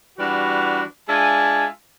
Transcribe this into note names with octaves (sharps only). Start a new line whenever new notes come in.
E3 G3 D4 F#4
G#3 D4 F4 E5 G#5